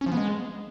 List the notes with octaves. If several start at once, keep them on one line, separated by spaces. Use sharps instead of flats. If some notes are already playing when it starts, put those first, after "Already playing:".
C#4
F3
B3
G#3